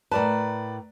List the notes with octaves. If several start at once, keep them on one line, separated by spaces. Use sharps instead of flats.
A2 A#4 B4 D5 A5 A#5